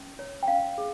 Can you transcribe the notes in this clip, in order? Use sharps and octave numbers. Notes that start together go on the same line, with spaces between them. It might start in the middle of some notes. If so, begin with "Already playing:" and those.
Already playing: C#4
C#5
G5
C#4 F5
G#4